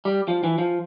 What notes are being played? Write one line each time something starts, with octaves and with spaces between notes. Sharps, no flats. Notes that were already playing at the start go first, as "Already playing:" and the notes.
G3
F3
E3
F3